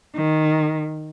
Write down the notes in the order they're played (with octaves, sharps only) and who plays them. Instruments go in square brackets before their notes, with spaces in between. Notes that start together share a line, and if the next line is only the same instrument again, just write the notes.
[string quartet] D#3